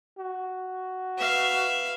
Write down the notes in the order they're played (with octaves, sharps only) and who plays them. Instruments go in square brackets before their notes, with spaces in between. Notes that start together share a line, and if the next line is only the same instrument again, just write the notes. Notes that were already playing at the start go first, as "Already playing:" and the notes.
[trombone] F#4
[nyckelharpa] B4 F5 [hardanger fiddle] E5